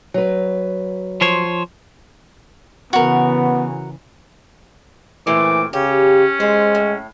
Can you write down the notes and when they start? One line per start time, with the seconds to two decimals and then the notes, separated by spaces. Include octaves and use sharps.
0.14 F#3 B4
1.21 F3 C5 C#5
2.93 C#3 E3 B3 F#4 A#4
5.27 A#2 E3 A3 C4 D6
5.73 C#3 C#4 G4
6.40 G#3 C4
6.75 A2